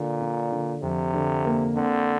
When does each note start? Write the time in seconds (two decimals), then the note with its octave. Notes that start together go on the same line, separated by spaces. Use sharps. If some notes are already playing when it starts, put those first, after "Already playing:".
Already playing: A#2 D3
0.21 D3
0.52 D3
0.83 F2 C3
1.14 D3
1.45 A#3
1.75 D3 C4